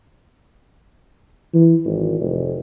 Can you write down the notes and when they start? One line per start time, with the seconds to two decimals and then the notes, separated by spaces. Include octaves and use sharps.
1.54 E3
1.84 G#1
2.19 F1